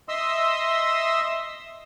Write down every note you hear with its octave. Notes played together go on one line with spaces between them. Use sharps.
D#5 E5 C6 D#6 E6